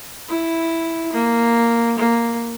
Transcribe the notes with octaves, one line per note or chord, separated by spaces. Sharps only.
E4
A#3
A#3